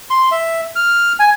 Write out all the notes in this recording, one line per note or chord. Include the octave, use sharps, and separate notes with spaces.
C6
E5
F6
G#5